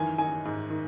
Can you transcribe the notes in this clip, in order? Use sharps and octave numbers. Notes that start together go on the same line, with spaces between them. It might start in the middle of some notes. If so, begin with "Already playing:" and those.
Already playing: F#2 D#3 E3 G#5
D#3 G#5
G#2
D#3